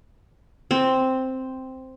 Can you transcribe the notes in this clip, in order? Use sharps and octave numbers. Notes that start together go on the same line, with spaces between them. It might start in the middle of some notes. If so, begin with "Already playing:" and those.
C4